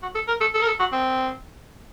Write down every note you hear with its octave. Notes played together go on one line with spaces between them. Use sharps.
F#4
A4
A#4
A4
A4
A#4
A4
F#4
C4